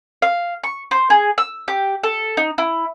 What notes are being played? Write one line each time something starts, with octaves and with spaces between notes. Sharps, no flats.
F5
C#6
C5
G#4
E6
G4
A4
D#4
E4